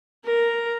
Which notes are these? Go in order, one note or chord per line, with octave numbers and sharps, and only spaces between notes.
A#4